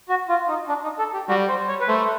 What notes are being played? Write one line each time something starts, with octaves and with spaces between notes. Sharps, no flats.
F#4
F4
D#4
D4
D#4
A4
G4
G3 F#4
C5
C#5
B4
A3 C5